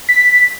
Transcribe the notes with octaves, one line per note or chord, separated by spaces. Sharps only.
B6